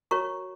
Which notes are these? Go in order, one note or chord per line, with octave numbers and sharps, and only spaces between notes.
F#4 A#4 C#5 A#5 C#6